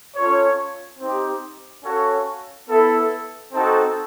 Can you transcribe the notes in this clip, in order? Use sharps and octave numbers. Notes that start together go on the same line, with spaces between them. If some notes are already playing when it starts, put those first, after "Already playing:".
C#4 F4 A4 C#5
C4 D#4 G4
C#4 F#4 A4 C#5 F5
B3 E4 A4
C4 D#4 F#4 A4